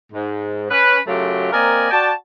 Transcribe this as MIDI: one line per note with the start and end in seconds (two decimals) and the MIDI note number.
0.13 0.65 44
0.70 0.98 61
0.70 0.98 71
1.07 1.50 42
1.07 1.50 49
1.07 1.50 54
1.07 1.50 57
1.07 1.50 65
1.07 1.50 67
1.52 1.89 58
1.52 1.89 60
1.52 1.89 70
1.52 1.89 74
1.52 1.89 75
1.52 1.89 80
1.91 2.11 66
1.91 2.11 74
1.91 2.11 79
1.91 2.11 81